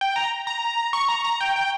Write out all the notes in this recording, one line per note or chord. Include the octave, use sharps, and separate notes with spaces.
G5
A#5
A#5
C#6
A#5
A#5
G5
G5